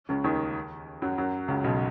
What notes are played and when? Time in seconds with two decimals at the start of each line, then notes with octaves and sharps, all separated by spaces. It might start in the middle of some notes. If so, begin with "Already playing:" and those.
0.09 C#2 C#3
0.24 D#2 D#3
1.02 F#2 F#3
1.18 F#2 F#3
1.48 C#2 C#3
1.64 B1 B2